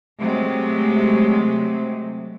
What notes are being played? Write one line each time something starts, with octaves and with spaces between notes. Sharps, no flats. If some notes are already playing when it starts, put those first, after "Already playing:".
C3 F#3 G#3 A3